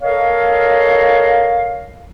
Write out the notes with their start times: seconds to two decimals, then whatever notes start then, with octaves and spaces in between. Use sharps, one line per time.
0.02 A4 A#4 C#5 D#5 F5